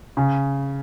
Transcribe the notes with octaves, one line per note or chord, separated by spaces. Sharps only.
C#3